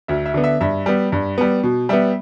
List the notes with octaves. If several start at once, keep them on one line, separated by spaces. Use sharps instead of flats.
D2 E5
E5
D3 B3
E5
G2 E5
G3 B3
G2
G3 B3
B2
G3 B3 E5